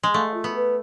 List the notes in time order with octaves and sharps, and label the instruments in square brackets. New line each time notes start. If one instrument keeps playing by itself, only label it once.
[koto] G#3
[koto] A3 [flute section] F5
[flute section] F4
[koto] B3
[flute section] B4